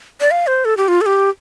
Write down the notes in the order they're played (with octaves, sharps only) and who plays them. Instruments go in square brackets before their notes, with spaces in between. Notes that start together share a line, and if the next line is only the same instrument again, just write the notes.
[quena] D5
F5
C5
A4
G4
F4
A4
G4